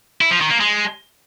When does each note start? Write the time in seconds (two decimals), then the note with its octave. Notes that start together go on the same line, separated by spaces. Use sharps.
0.21 E4
0.31 F3
0.41 D#3
0.51 A#3
0.60 G#3